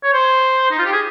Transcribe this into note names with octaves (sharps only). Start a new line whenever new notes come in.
C#5
C5
D#4
F4
G4
G#4